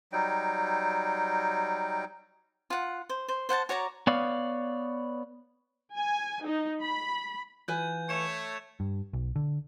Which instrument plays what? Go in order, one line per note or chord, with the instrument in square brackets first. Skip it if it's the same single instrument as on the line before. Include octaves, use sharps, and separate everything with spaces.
[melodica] F#3 G3 D#4 G5
[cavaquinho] F4 F#5
C5
C5
C5 F#5 G#5 A5
F#4 C#5 D5 A#5
[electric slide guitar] B3 C#5 D5 F5
[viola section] G#5
D#4
B5
[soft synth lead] E3 [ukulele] F4 B4 G#5 [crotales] G6
[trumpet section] A3 C#5 [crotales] C#7 E7
[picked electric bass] G2
B1
D3